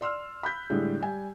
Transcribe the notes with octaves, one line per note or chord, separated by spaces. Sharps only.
D5 C6 E6 F6
B5 F#6 G6 B6
A2 D3 G3 G#3
G3 G#5